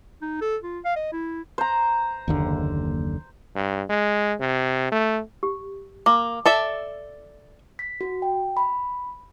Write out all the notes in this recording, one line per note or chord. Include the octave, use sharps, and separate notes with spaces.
D#4
A4
F4
F5
D#5
E4
C5 A#5
F#1 D#2 D3
G2
G#3
C3
A3
G4
A#3 D6
A4 D5 E5
B6
F#4
G5
B5